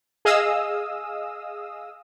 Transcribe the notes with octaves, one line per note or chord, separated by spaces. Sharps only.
G#4 D#5 F5 D#6 E6